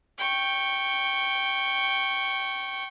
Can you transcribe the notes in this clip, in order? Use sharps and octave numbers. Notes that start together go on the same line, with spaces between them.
G5 C#6